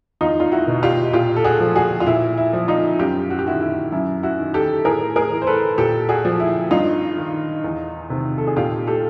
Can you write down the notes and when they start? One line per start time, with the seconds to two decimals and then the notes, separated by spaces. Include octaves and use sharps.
0.21 E2 D#4 F4
0.40 F4
0.52 E4 F#4
0.67 B2
0.83 F4 G4
1.13 A#2 F4 G4
1.36 A4
1.44 F#4 G#4
1.60 F3
1.76 F#4 G#4
2.00 F4
2.07 A#2 E4
2.38 E4
2.53 F3
2.68 D#4 F4
2.99 F#2 F4 G4
3.30 F#4
3.39 G4
3.46 D#3 E4 F#4
3.61 E4
3.92 F#2 E4
4.23 E4 F#4
4.39 D#3
4.54 G4 A4
4.85 A2 G#4 A#4
5.16 G#4 A#4
5.32 E3
5.42 C5
5.47 A4 B4
5.78 A#2 G4 A4
6.09 F#4 G#4
6.25 F3
6.40 E4
6.71 G2 D#4 F4
7.17 D#3
7.64 E2
8.10 C3 D#3
8.38 A4
8.47 G#4
8.56 A#2 F4 G4
8.87 G4 A4